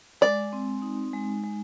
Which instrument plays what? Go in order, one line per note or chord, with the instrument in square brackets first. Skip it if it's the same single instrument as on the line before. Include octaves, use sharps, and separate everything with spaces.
[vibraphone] G#3 [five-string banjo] D5
[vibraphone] C4
D#4
G#3
G#3